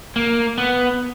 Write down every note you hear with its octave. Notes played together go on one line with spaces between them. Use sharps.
A#3
B3